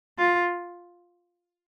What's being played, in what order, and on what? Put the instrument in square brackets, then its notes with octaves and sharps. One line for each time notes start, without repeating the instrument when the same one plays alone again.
[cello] F4